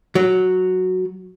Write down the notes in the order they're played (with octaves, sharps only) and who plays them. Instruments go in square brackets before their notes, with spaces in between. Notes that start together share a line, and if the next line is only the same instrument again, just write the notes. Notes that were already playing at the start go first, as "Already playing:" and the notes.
[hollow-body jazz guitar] F#3